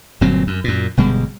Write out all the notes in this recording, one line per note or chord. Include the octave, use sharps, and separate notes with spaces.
G1 A#2 F#3 C4
F#2
F#2 A#2
G1 B2 G3 G#3